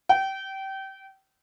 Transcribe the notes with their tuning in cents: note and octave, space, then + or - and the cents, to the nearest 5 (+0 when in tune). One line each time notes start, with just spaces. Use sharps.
G5 -25